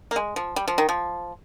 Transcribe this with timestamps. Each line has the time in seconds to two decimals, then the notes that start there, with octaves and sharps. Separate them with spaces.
0.11 A#3
0.16 G#3
0.36 F3
0.56 G3
0.68 F3
0.78 D#3
0.89 F3